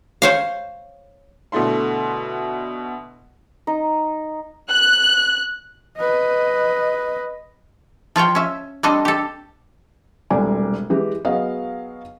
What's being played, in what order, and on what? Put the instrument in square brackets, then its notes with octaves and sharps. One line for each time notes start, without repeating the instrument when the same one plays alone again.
[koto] C5 C#5 F5
[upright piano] B2 D3 A3 E4 C6
[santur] D#4
[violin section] F#6
[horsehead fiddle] B4 D#5
[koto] F3 F4 C#5 G5
C#4 E5
G3 C4 D4 A4 D#5
G4 A4
[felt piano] E1 C2 A3 D5 G#5 D6
E3 G#3 G4
F#3 B3 G#4 D#5 F5